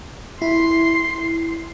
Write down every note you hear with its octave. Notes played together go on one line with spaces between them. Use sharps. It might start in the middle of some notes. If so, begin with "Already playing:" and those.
E4 C6 C7